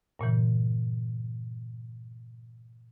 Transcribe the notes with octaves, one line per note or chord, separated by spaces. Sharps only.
G2 A#2 C#3 E3